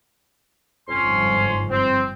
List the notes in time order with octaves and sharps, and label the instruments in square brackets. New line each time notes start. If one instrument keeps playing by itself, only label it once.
[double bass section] G1 G#2 F3 [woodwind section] F2 C#4 C6
[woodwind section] C4